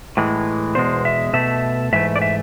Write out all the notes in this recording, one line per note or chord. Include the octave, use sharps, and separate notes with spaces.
A2 E3 G#3
E2 B2 G#3 C5
E5
B2 A3 E5
G#2 E3 A3 E5
D5
E5